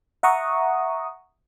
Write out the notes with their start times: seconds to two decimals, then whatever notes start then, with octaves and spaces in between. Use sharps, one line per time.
0.23 E5 F#5 A#5 C#6 D#6